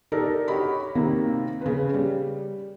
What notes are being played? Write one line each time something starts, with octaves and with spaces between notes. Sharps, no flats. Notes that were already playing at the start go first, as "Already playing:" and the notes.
D#4 G4 A4 A#4 D5
F#4 G4 C#5 D#5 B5
C3 D#3 A#3
C#3 B4
G3